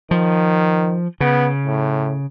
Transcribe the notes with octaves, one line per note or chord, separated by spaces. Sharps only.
D#3 F3
C#3 B3
A2